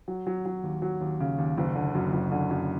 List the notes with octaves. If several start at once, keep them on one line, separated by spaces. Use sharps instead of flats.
F#3
F#3
F#3
D#2
F#3
D#2
C#3
D#2
F#1
D3
F#2
F#1
D3
F#2